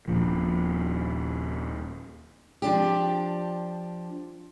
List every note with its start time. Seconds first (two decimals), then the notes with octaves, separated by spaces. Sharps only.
0.08 D#1 A#2 F3
2.62 F3 D4 G4